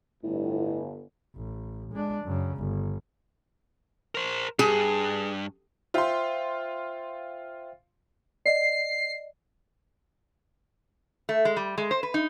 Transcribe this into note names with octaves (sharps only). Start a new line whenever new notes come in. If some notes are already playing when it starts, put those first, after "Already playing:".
G1 A2
A1
G#3 D4
F#2 C#3
G1
A#4 C5
G2 G#4
F4 C5 E5 G5 C6
D5 D#5 C7
A3
G#3
G3
G#3
C5
B4
D#4